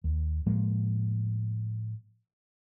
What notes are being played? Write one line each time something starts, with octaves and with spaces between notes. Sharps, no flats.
D#2
A2 F3 G#3 A#3